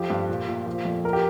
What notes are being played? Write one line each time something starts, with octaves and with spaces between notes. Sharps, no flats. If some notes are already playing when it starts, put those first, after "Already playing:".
Already playing: F2 F3 G4
G2
A#2
A#2
F3
F2
A#4
G4